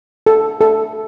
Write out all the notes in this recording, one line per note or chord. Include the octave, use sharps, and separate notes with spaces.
A4
A4